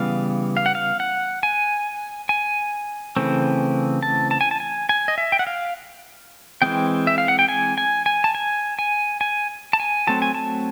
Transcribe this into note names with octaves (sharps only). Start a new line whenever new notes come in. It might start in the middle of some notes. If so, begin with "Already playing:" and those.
Already playing: C#3 E3 G3 B3 F5
F5
F#5
F5
F#5
G#5
G#5
C#3 E3 A3 C4
A5
A5
G#5
A5
G#5
G#5
D#5
E5
G5
F#5
F5
E3 G#3 C4 G5
E5
F5
F#5
G5
G#5
G#5
G#5
A5
G#5
G#5
G#5
A5
G#5
F#3 A3 C4 A5
G#5
A5